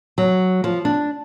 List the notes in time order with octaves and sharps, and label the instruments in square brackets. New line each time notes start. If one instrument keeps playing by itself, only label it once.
[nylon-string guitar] F#3
F3
D4